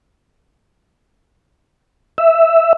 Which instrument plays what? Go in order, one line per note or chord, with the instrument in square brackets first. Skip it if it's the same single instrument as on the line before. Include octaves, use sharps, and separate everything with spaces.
[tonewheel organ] E5